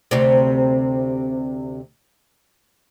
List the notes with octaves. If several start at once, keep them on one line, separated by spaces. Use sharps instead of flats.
D2 C3